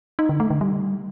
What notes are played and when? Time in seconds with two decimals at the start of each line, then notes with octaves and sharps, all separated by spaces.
0.19 D#4
0.29 D3
0.40 A3
0.50 D3
0.61 G3